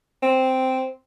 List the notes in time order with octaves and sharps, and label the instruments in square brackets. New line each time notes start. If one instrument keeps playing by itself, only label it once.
[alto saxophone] C4